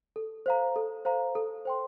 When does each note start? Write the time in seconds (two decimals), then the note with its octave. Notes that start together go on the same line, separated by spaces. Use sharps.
0.16 A4
0.46 C5 F5 A#5
0.76 A4
1.05 C5 F5 A#5
1.35 A4
1.65 C5 G5 C6